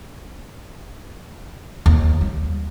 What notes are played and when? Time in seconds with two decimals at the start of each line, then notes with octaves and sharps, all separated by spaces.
1.86 D#2
2.21 G3